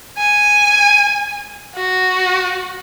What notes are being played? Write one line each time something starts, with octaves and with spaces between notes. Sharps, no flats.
G#5
F#4